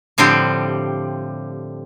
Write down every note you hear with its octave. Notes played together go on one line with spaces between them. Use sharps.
A2 D3 F3 G3 C4 G4